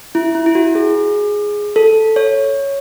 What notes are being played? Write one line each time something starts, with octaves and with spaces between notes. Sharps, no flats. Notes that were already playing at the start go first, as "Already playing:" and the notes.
E4
E4
E4
F#4
G#4
A4
C#5